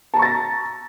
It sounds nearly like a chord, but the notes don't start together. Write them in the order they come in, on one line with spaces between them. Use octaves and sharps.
A5 A#5 C#6 A6 A#6